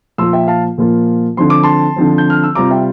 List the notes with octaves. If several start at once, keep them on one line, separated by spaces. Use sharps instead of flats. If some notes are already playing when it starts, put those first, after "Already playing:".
A#2 F3 A#3 F4 C6 E6
E5 G5
F5 A5
A#2 F3 A#3 F4
D3 F3 C4 C6
D6
A5 C6
D3 F3 C4
G6
F6
E6
C3 G3 C4 F4 A#5 D6
E5 G5